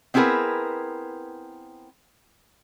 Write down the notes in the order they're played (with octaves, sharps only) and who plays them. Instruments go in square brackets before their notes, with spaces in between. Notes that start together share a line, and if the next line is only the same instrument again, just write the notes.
[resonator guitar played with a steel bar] B3 C4 E4 G#4 A#4 B4